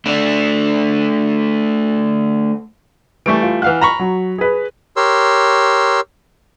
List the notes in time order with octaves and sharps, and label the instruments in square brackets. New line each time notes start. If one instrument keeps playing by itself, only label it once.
[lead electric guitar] A3 D4
[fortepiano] E3 G3 A3 [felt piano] C#6 D7
[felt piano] F4
[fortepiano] E3 F5 F#6 [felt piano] F#5 F6
[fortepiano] A#5 B5 C#6
[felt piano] F#3
G#4 B4
[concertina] G4 A#4 C#5 C6 E6